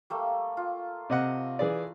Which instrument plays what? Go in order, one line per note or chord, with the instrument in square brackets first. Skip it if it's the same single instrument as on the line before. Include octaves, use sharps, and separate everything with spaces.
[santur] G3 A3 A#3
F4
[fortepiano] C3 D#5 F#5
E3 G#4 D5